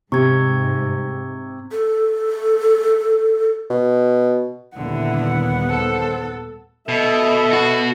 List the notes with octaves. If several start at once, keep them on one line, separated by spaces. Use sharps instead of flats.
G#2 C3 C#6 G#6
A4
B2
D#2 A#2 D3 G3 B3 E4 F#5
D#3 A4 C5 A5
B2 A4 D#5 E5
F#4